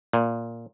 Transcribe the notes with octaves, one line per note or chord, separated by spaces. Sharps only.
A#2